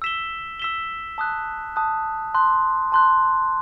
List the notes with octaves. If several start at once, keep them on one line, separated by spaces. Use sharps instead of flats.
E6 B6 E7 G7
E6 B6 E7 G7
A5 D#6 F#6
A5 D#6 F#6
A5 C6 F#6
A5 C6 F#6